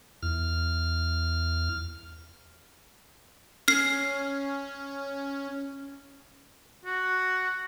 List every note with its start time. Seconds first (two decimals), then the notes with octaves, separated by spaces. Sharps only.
0.23 E2 F6
3.68 C#4 F6 C7
6.85 F#4